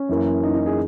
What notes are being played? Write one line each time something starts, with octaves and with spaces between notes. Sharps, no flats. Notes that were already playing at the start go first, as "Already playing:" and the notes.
Already playing: C#4
F#2 E3 A#3
D#4
D#4
G#4